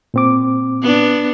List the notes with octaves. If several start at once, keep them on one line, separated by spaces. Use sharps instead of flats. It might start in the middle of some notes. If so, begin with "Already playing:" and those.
A#2 C4 D6
B3 D4